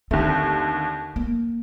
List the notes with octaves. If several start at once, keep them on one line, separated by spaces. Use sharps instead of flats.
D#2 D3 A3 C4
A#3